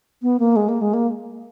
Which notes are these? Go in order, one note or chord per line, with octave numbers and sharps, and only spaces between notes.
B3
A#3
G#3
A#3
G#3
A#3